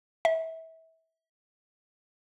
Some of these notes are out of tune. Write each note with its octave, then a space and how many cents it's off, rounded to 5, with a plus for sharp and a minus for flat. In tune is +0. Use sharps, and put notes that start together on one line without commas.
E5 -25